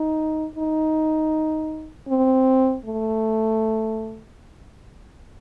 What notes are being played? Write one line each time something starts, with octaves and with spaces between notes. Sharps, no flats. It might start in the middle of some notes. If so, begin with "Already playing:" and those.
Already playing: D#4
D#4
C4
A3